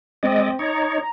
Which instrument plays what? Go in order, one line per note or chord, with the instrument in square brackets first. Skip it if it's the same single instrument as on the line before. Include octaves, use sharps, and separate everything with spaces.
[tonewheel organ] G#3 D5 D#5 [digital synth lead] C4
[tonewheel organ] D#4 C#5 [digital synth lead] A#5